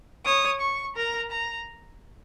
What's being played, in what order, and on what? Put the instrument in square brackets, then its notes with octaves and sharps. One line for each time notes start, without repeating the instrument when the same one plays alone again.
[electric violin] C#5 [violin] D#6
[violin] C#6
[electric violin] A#4 [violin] A#5
[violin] A#5